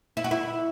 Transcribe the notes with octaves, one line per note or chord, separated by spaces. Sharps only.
E4
F#4
E4